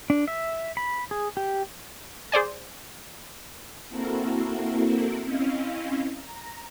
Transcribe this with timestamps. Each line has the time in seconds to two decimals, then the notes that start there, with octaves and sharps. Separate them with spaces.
0.10 D4
0.28 E5
0.77 B5
1.11 G#4
1.37 G4
2.32 G#4 C5 D5 G#5
3.89 A#3 C4 E4 F#4 A4 A#4
5.23 C4 C#4 E4 D#5 F5
6.16 A#5